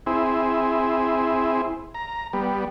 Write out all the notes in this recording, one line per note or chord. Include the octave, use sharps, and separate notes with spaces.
C4 E4 G#4
A#5
G3 B3